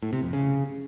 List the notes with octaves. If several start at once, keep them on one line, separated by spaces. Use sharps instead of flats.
A2
C3
F2
C#3